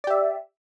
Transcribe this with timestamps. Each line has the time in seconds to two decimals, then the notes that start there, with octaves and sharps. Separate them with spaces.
0.04 D5
0.07 G4
0.10 E5